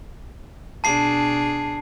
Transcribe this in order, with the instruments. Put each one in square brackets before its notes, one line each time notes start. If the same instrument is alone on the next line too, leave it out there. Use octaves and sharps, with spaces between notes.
[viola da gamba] B2 D4 G#4 [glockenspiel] A5 C7